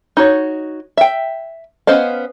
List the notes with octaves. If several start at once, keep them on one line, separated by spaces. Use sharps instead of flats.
D#4 F#4 C#5
E5 G5
B3 C#4 C5 D#5 F5